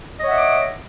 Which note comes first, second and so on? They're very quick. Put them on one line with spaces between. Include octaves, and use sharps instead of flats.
D#5 C#5 F#5 E5 D6